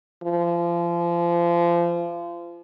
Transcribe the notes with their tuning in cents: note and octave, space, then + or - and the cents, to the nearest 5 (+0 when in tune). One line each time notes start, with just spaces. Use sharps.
F3 -30